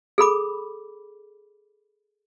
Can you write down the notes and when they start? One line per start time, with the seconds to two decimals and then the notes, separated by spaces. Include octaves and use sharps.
0.18 G#4 A4 B5 D6